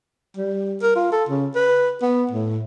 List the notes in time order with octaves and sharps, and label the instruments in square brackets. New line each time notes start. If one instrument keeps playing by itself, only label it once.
[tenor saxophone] G3
A#4
F4
A4
C#3
B4
B3
A2